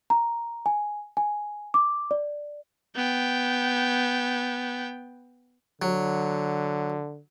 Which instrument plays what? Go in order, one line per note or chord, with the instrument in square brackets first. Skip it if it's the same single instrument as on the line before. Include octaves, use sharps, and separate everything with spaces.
[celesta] A#5
G#5
G#5
D6
D5
[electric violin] B3 G5
[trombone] D3 [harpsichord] F#3